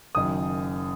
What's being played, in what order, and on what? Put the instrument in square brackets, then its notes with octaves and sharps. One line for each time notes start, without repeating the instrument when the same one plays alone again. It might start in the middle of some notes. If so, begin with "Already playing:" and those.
[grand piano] F#1 F#2 D#3 D#6